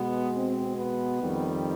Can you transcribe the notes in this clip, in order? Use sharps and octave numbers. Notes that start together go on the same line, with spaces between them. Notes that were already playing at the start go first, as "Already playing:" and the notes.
Already playing: B2 G#3 B3
C4
B3
F2 D#3 G3